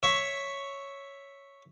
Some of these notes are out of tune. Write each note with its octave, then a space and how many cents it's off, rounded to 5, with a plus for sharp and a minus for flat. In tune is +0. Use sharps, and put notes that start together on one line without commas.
C#5 +0 E5 +0 C#6 +0